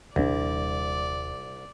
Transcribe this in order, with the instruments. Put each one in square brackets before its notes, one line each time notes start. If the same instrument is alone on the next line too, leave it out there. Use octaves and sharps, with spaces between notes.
[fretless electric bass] D#1 D4 [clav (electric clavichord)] C2 [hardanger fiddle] D5